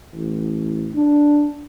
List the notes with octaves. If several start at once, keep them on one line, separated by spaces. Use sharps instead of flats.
A1
D4